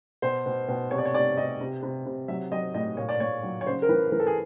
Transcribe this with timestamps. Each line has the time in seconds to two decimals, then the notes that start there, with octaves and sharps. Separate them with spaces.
0.22 B2 C5
0.46 B2
0.68 B2
0.91 C3 C#5
0.98 D5
1.05 C#5
1.14 C3 D5
1.36 C3 D#5
1.60 C3
1.83 C3
2.06 C3
2.28 F#3 E5
2.51 F#3 D#5
2.74 A2 D#5
2.97 A#2 C#5
3.09 D5
3.20 A#2 C#5
3.43 F#3
3.61 C#5
3.66 C#3 C5
3.82 A#4
3.89 E3 B4
4.12 E3 A#4
4.20 A4
4.27 G#4